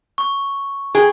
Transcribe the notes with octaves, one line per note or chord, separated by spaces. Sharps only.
C#6
G#4 G5